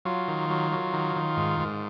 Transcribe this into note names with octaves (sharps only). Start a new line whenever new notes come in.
F#3 F4
D#3
F#3
F#3
D#3
D#3
G#2
G#2